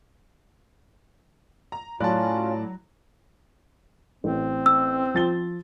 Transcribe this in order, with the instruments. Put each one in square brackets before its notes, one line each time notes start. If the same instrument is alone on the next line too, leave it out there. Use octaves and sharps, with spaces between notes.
[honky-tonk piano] A#5
[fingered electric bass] A2 [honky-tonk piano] F#3 B5 F#6 [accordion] C#4 F4 [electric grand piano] D5 A5
[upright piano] A1 [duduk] C4
[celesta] E6
[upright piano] F3 A6 G7